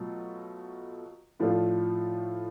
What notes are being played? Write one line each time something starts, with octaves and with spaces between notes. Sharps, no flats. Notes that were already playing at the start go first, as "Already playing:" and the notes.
Already playing: B2 F#3 A3 F4
A2 F3 A3 D4 F4